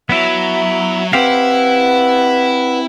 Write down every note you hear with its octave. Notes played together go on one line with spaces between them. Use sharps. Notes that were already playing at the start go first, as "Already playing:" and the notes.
F#3 B3 E4 E5
C4 E4 G4 B4 F5 F#5